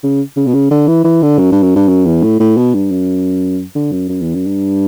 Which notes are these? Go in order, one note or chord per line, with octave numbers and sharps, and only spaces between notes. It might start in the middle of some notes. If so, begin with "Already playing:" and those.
C#3
C#3
B2
C#3
D3
E3
E3
D3
F#2
G2
F#2
G2
F#2
E2
A2
A2
B2
G2
F#2
D3
F#2
F#2
E2
F#2
G2